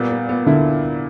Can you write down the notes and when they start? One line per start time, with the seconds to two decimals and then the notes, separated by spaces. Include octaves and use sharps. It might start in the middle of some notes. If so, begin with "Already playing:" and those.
Already playing: A#2 G3 B3
0.10 B3
0.29 B3
0.46 D3 E4